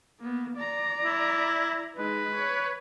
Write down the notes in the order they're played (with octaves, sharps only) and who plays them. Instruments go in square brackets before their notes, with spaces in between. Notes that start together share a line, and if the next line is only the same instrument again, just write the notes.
[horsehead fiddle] A#3 B3
D5 A#5
[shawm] E4
[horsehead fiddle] G#3 D#4 [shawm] B4
[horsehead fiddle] C#5